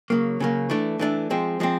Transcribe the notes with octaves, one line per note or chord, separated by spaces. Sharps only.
C#3 F#3 A#3
C#3 F#3 A#3
E3 A3 D4
E3 A3 D4
F3 G#3 C4
F3 G#3 C4